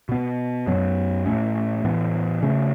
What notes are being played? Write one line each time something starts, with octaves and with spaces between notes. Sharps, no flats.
B2 B3
F#2 F#3 B3
A2 A3 C#4
A2 E3 B3
C#3 A3 C#4